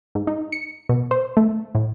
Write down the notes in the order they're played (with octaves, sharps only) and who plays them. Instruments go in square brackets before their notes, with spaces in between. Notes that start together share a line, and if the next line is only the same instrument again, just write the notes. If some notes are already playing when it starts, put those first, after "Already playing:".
[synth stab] G#2
D#4
C#7
B2
C5
A3
A2